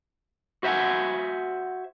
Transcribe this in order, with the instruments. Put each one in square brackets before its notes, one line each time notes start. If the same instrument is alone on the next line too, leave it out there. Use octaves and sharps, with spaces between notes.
[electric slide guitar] F#4 C5 E5 F#5 G#5